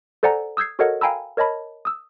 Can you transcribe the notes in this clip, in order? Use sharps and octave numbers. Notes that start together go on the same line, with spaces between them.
A4 C5 D5 F#5 G#5 A#5
D#6 E6 G6 G#6 C7
F#4 A4 A#4 C#5 D#5 F#5
F5 G5 G#5 A#5 B5 E6
A#4 C#5 D#5 A5 B5
D#6 E6